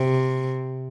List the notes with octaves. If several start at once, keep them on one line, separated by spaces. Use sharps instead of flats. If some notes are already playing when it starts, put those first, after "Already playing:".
Already playing: C3